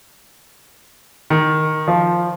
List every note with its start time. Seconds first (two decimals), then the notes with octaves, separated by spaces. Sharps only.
1.30 D#3
1.88 F3